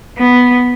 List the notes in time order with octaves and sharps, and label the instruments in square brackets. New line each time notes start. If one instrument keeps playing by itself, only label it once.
[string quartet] B3